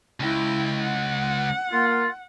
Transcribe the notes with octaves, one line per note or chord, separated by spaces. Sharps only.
C#2 E4 G5
F#5
A#3 F4